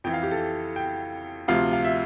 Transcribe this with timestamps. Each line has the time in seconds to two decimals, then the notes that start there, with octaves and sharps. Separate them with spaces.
0.04 F2 E3 G5
0.14 F5
0.22 G4
0.31 A4
0.76 G5
1.48 D2 C3 F3 F5
1.73 F5
1.84 E5